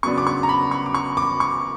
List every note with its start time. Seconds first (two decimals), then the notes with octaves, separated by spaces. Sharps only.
0.03 C#3 F#3 B3 D4 C#6
0.18 D6
0.27 C#6
0.43 A#5
0.49 B5
0.71 C#6
0.86 D6
0.94 C#6
1.17 D6
1.40 C#6